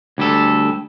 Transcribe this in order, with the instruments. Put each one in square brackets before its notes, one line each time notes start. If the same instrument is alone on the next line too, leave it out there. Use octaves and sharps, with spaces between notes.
[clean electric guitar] D2 G3 A4